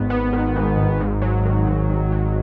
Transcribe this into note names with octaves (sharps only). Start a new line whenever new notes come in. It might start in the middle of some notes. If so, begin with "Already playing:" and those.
Already playing: G#1 G#2 D#3 B3
B3
D#3
G#2
G#1
G#2
F#3
D#3
G#2
G#2
F#3